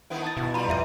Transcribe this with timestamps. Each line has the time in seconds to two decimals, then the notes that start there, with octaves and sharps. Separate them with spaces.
0.10 D#3 B3 E4
0.23 A5 D#6 A6
0.37 B2 E4
0.54 G3 F4 A#5 B5
0.69 F2 B4 E5 D#7